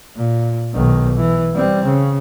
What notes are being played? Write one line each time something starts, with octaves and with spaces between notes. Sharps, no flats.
A#2
B1 D#3
E3
G3 C4
C#3